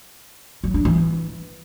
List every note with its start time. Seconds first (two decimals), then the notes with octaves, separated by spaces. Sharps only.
0.64 F#3
0.74 D4
0.85 E3